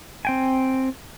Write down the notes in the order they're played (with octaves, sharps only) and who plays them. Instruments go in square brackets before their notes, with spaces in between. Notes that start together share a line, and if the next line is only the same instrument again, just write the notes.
[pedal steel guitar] C4 G5 G#5